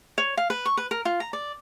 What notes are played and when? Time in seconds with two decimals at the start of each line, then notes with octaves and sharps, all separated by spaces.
0.18 C#5
0.37 F5
0.50 B4
0.66 C#6
0.77 B4
0.91 A#4
1.05 F4
1.20 A#5
1.33 D5